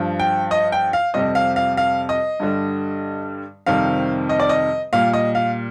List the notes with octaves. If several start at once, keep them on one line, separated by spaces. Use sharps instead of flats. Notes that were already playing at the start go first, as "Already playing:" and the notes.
Already playing: G2 F3
G5
D#5
G5
F5
F2 C3 G3 D#5
F5
F5
F5
D#5
G2 D3 G3
F2 C3 D#3 G3 F5
D#5
D5
D#5
A#2 G3 F5
D#5
F5